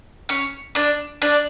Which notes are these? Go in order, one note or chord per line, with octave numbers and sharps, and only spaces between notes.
C#4 C#5
D4 D5
D4 D5